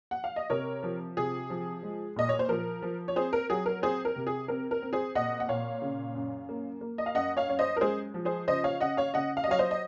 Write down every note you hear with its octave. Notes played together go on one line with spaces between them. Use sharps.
F#5
F5
D#5
C3 A#4 C#5
F3
C3 G#4
F3
G#3
A#2 D#5
C#5
C5
F3 A#4
F3
C#5
C4 G#4 C5
A#4
F#3 G#4
A#4
C4 G#4 C5
A#4
C3
G#4
C4 A#4
A#4
C4
G#4 C5
A#2 D#5 F#5
F#5
A#2 C#5 F5
C#3
F#2
A#3
A#3
D#5
F5
F#2 D#5 F#5
C#5 F5
F#2 C#5
C5 D#5
A#4
G#3 G#4 C5
F3
G#4 C5
C#3 C5 D#5
C#5 F5
C#3 D#5 F#5
C#5 F5
C#3 D#5 F#5
F5
D#5
F#3 C#5 F5
C5 D#5
D#5